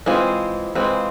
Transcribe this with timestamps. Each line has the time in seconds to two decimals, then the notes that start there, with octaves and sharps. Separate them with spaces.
0.06 E3 G#3 C4 F4
0.75 E3 G#3 C4 F4